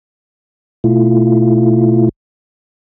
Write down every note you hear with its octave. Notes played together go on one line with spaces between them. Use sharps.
B2 A3 E4 F4